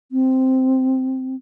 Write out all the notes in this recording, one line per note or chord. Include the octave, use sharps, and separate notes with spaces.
C4